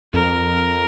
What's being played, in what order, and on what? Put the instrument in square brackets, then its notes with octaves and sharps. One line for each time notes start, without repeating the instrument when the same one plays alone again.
[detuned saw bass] F2 [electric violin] A#4